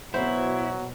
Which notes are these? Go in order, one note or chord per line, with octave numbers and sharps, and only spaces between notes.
B2 F#3 E4 C5